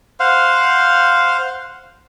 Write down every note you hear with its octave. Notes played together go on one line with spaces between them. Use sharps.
C5 F5 F#5